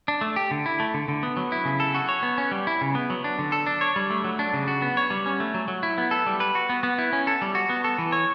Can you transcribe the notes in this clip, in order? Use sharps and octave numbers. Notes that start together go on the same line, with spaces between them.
D4
A3
G4
D3
E4
A3
D3
D3
B3
F#3
E4
C#3
A4
F#4
C#5
B3
C#4
G3
E4
C#3
B3
F#3
D4
D3
A4
D4
C#5
G3
A3
F#3
D4
C#3
F#4
B3
C#5
G3
C#4
A3
F#3
F#3
E4
B3
A4
G3
B4
F#4
B3
B3
E4
C#4
A4
G3
F#4
B3
A4
E3
C#5